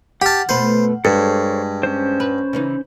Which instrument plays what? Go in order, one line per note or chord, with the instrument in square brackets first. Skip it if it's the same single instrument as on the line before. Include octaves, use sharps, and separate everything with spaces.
[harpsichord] G4 A5 [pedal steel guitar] F#5 F6
[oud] B2 A3 B4 [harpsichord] C5
[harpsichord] G2 [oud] G#3 [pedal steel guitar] A4 C5 C#5
[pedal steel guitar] C#4 C5
[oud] B4
C#3 E3 D#4